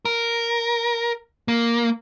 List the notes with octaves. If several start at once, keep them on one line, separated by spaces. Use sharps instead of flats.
A#4
A#3